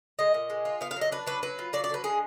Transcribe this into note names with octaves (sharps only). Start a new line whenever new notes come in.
G#3 D#5
A#2
G#3
F4
B3 F5
F5
F#3 D#5
D4 B4
F#3 B4
F#3 B4
F4
F#3 D5
D5
D3 B4
G#3 G#4